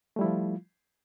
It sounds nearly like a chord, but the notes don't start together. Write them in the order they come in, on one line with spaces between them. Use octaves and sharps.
A3 G3 E4 F3 F4